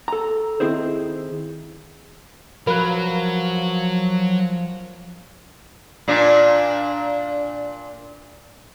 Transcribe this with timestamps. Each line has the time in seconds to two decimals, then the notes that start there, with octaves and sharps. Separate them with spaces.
0.08 A4 A#5
0.60 D#3 C4 E4 G#4 C5
2.67 F3 F#3 A#4 B4 F5 B5
6.08 A#2 D4